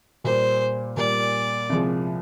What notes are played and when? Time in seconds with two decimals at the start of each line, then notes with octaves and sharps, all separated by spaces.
0.24 A#2 G3 A#3 C5
0.97 A#2 G3 A#3 D5
1.69 C2 C3 F3 G#3